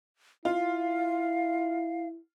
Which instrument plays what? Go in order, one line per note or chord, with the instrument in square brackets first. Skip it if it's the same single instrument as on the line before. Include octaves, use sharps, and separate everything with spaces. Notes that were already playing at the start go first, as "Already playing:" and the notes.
[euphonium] E4 [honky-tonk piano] F4 [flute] F5